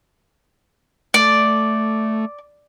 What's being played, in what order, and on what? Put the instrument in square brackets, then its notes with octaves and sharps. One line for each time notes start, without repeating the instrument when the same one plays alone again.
[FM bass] A3 [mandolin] D5